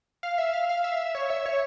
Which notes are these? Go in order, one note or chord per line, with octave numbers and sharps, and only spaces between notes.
F5
E5
F5
F5
E5
C#5
E5
C#5